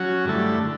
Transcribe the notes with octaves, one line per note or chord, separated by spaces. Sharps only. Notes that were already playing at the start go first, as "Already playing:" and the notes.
Already playing: F#3 C#4 F#4
G2 D3 A3 E4 A4
D3